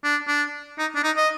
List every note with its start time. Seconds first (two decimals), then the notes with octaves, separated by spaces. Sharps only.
0.04 D4
0.28 D4
0.78 D#4
0.95 D4
1.03 D#4
1.17 D#5